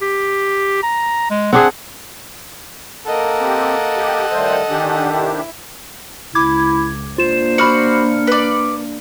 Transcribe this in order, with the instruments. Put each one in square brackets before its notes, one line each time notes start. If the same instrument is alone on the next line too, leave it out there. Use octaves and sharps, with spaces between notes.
[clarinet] G4
A#5
G#3
[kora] C4 D4 G#4 [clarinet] F#5
[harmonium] A#3 A#4 [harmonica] A4 F#5 [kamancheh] D#5
[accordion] C4 G4
G4
[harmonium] D#3 G3 A3 [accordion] C5
[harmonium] D3 G#5 [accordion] D#3 D4 G4
[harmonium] C3 [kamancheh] E4
[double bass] C#2 [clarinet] E4 [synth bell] D6 G#6
[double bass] A#3 D4 [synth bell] F4 E7 [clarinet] C5
[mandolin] F#4 D5 [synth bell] B5 F6 C#7
[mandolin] B4 D5